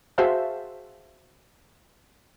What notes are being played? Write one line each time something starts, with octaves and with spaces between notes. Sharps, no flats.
F#4 G#4 C5 E5 F5 A5